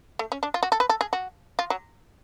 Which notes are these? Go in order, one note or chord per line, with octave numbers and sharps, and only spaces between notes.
A3
C#4
D4
F4
F#4
A4
B4
A4
G#4
F#4
F4
F#3